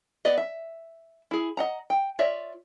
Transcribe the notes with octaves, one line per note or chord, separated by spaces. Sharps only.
B3 B4 D5 D#5
E5
E4 G#4
D#5 F#5 A#5
G5
F4 C#5 D5 E5